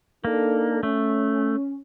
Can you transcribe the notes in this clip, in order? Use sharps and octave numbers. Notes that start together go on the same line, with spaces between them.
A#3 D4 D#4 A4
A3 C#4